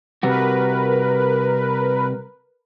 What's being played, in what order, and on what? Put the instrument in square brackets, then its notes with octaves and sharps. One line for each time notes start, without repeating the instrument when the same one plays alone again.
[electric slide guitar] C3 G3 F#4 [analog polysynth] A#4 B4